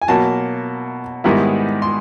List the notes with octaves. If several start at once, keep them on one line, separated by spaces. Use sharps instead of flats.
G#5
B2 F#3 A#3 A5
G#2 D#3 G3 B3 E4
C6